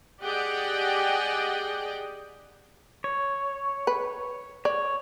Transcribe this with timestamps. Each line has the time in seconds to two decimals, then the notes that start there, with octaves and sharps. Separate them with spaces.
0.22 G4 G#4 D5 D#5 F#5 G5
3.04 C#5
3.87 B4
4.65 C#5 D5